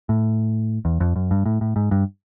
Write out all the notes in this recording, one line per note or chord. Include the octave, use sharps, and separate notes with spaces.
A2
E2
F2
F#2
G2
A2
A2
G#2
G2